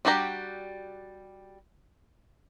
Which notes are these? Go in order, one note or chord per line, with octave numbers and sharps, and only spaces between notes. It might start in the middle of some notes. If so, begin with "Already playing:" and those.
G3 D4 F#4 G4 A#5